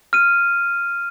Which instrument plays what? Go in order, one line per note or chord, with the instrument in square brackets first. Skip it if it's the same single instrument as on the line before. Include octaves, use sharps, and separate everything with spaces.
[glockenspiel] F6 D#7